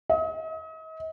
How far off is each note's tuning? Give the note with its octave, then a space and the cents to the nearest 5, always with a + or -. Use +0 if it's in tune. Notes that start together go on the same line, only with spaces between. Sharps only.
D#5 +40